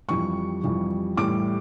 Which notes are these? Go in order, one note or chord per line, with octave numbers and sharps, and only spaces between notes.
F2 E3 G3 C#6
F2 E3 G3
A2 E3 G3 D6